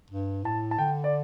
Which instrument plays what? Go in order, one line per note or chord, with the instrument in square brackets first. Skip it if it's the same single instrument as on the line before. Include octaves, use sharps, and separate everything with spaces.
[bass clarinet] G2
[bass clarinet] A2 [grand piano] A5
[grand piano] A5
[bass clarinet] D3 [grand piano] G5
[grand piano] D5